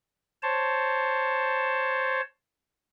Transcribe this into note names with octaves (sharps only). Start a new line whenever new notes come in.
C5 C#5 A5